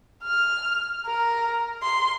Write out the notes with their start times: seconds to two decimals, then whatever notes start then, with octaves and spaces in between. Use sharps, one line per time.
0.24 F6
1.06 A#4
1.83 C6